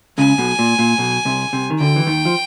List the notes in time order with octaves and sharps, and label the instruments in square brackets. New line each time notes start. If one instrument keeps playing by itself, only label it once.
[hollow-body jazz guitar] C#2 C#3 [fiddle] G#5
[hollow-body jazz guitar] B1 B2
A#2
A#2
B1 B2
C2 C3
C2 C3
D#3
[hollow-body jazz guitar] D2 D3 [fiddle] G5
[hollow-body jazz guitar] E3
D#2 D#3
F3